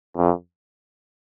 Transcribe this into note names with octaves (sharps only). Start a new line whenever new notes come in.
F2